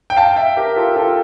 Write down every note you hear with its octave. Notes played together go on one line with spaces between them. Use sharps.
G5
F5 A5
E5 G5
G4 A#4
F4 A4
F4 A4